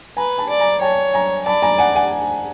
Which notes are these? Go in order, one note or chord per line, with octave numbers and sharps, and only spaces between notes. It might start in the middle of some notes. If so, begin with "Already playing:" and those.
B4 G#5 A#5
A5 B5
D5
G#5 A#5
C#5 G5 A5
G#5 A#5
D5 A5 B5
G#5 A#5
F#5 G#5
F#5 G#5